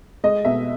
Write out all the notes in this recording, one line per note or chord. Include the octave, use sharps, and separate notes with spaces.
G#3 D#5
B2 E5